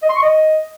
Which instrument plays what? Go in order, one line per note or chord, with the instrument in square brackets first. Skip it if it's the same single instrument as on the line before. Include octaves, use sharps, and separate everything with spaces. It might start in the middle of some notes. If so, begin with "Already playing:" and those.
[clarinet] D#5
C6
C#6
D#5